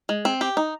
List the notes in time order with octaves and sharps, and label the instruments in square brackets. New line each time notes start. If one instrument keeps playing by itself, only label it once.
[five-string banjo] G#3
C4
G4
D#4